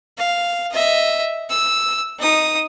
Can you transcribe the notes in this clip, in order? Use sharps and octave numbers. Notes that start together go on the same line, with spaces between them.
F5
D#5 E5
E6
D#4 D#6